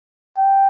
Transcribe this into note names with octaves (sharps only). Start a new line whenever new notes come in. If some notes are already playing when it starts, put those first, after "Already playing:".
G5